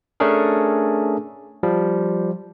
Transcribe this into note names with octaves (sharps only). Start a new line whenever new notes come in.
A3 C#4 D4 G#4 A#4
F3 G3